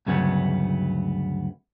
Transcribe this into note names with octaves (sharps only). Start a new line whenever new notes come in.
D2 G2 C#3 F#3 A3 B3